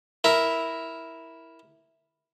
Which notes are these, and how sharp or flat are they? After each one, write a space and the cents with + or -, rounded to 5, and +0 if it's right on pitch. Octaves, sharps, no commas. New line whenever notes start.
E4 -5 A#4 +0